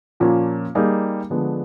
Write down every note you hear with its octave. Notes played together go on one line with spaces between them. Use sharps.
A#2 F3 A#3 C#4
G3 A#3 D#4 G#4
D3 F3 G#3 B3 D4